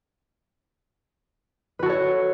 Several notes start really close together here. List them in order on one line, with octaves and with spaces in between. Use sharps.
B4 F#4 A4 C#5